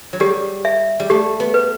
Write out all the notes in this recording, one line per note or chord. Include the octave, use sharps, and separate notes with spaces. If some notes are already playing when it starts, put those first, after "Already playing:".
F#3
G3 G4
E5
G3
A3 G4
B3
B4